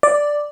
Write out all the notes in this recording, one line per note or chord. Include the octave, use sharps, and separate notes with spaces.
D5